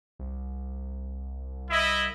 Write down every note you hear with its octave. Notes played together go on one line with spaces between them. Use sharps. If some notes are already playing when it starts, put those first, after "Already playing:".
C2
E4 D#5 E5